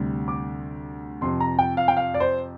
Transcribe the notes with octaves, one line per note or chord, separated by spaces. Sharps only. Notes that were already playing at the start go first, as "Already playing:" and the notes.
Already playing: D2 C3 G3
D6
F2 C3 F3 C6
A#5
G5
F5
G5
F5
D5
C5